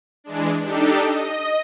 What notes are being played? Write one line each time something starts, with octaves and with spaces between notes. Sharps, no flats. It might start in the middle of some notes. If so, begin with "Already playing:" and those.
E3 G#3 D4
D4 D#4 G4 A4
D#5